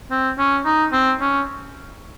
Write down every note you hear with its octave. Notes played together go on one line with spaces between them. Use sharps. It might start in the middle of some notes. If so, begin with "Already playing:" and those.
C4
C#4
D#4
C4
C#4